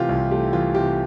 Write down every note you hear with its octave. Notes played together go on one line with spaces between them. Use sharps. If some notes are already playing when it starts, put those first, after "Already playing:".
Already playing: C3 E3 A3 F4 G4
C2
A3 G4
E3 F4
C3 G4